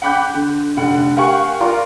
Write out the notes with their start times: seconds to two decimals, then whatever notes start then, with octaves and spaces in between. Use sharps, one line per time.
0.02 F#5 G5 B5 D6 F#6 G6
0.34 D3
0.77 F1 D3 F#5
1.16 G4 A#4 F5 F#5 G#5 C#6
1.60 F4 A#4 D5 A#5 C6